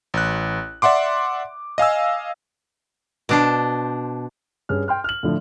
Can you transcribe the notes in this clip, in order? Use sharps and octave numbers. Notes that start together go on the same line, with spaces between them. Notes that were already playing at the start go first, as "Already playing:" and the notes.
A1 F#6
D5 E5 F#5 C6 D6
D#5 F5 G#5 E6
B2 D4 C5
G2 C#4 G#4 F6
G5 C6 F6
F6 F#7
A2 D3 F3